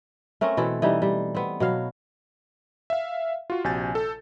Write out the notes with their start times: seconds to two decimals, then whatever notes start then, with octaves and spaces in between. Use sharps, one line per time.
0.41 A3 C4 C#4 A#4
0.57 B2 E3 C4 A4
0.82 E3 G3 D#4
1.02 G3
1.35 B3 C4
1.60 B2 F#3 F5
2.90 E5 F5
3.50 F4 F#4
3.64 A#1 C3 F#4 G#5 G6 A6
3.95 A4